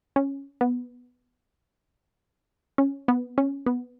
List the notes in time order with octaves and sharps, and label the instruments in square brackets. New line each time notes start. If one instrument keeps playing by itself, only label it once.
[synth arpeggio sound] C#4
B3
C#4
B3
C#4
B3